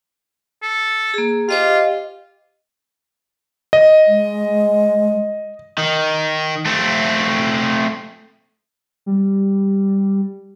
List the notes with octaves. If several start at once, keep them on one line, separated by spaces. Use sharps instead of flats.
A4
A#3 G#4
F4 G4 C5 D#5 F5
D#5
G#3
D#3
A3 C4
G3